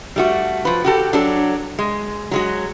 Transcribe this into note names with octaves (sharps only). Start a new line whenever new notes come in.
G3 A3 F#4
F3 B4
F#4 G4 A4
F#3 D4 A4
G#3
F#3 G#3 F#4